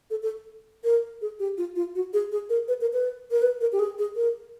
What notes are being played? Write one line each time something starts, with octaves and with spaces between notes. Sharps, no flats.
A4
A4
A#4
G#4
G4
F4
F4
F#4
G#4
G#4
A#4
B4
A#4
B4
A#4
B4
A#4
G4
G#4
G#4
A#4